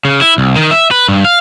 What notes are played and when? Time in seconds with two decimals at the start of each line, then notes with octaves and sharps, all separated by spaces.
0.05 C#3
0.21 E4
0.38 C2
0.56 D#3
0.71 E5
0.91 B4
1.09 G2
1.25 F5